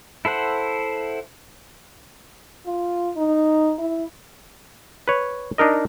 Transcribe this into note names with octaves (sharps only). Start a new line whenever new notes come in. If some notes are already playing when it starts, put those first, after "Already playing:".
E4 A4 C5 F#5
F4
D#4
E4
B4 C#5
D4 D#4 A#4 D#5